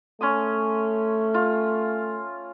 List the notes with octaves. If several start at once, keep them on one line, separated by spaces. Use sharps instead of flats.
A3 C#4 C6 D#6
F4